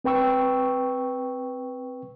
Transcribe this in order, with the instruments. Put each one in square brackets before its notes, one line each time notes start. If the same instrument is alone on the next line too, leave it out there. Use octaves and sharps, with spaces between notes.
[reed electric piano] C4 B4 G5 C#6 E6